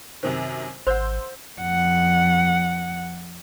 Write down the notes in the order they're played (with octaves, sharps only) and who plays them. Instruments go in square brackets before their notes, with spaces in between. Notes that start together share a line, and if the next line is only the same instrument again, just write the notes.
[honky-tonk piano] F#2 C3 D#3 [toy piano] C5
[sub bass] G#1 [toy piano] C5 F#5 [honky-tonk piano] C6 E6 G6
[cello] F2 F#5